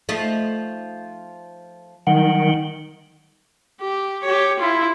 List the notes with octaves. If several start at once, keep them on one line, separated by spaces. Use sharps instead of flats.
F3 A3 D#4
D#3 F#3 G3 F#5
G4
G4 C#5
E4 F4